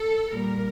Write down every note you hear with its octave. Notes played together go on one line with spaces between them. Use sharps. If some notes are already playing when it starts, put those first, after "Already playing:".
Already playing: A4
A#2 G3 A#4